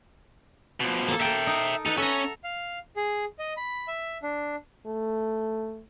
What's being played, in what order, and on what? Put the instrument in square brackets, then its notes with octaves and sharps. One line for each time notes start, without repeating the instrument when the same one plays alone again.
[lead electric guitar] B2 F3
[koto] A#3 A4
[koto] A4 A#4 [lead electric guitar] E5 G5
[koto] D#4
[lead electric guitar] D#4 [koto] A4 B4 F#5
[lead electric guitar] C#4 [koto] A4 E5 A#5
[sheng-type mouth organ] F5
G#4
D#5
B5
E5
D4
[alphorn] A3